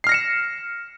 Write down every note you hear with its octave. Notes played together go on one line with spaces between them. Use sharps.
F6 A#6 C7 C#7 E7